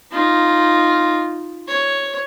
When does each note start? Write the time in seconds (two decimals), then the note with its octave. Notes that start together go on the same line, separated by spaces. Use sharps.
0.12 D#4 F4
1.68 C#5